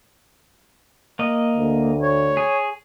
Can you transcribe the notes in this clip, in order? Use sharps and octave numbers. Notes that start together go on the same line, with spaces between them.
A#3 D#5
D2
C#5
G#4